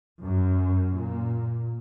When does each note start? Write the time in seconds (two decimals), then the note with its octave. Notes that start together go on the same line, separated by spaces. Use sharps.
0.22 F#2
0.94 A#2